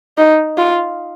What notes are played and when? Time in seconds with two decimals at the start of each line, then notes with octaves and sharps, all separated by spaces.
0.18 D#4
0.57 F4